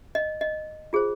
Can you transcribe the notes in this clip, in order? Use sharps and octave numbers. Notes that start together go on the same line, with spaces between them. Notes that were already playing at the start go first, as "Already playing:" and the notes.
D#5
D#5
F4 G#4 C5